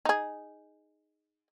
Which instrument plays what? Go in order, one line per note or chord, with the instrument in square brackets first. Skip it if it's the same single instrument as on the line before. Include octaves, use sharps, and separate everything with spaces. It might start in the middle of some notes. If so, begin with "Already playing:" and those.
[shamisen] D#4 G#4